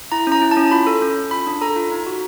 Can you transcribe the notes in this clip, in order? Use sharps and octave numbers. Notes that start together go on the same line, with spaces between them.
E4 A#5
C#4 A#5
E4
A5
C#4
F4 B5
A4
C#4
C#4
F4 B5
D4
A4 A#5
F4
D#4
F#4